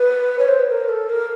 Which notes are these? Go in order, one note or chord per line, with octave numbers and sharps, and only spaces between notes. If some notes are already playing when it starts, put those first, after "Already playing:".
Already playing: B4
C#5
C5
B4
A#4
A4
A#4